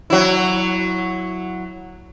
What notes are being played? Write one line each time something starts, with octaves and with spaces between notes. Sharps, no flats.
F#3 E4